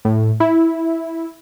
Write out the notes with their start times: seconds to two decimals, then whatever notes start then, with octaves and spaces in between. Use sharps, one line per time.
0.05 A2
0.40 E4